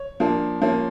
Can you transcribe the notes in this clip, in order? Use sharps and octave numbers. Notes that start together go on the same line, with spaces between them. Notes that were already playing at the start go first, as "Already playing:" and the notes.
Already playing: C#5
F3 A#3 D4
F3 A#3 C#4